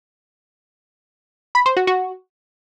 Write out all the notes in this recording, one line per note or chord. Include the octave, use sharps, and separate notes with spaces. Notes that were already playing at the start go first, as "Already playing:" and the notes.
B5
C5
F#4
F#4